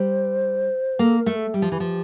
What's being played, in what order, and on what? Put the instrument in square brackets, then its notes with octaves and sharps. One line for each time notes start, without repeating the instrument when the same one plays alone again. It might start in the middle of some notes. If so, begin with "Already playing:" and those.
Already playing: [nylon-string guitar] G3 [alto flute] C5
[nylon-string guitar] A#3 [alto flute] A4
[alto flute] A#4
[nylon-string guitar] A3
[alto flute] A4
[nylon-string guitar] G3 [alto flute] G4
[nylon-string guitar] F3
E3
F3